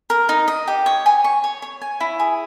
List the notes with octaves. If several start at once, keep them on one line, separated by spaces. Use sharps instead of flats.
A#4
D#4
D#5
G4
C#5
G#5
C#6
C#5
C#5
G#5
E4
G#4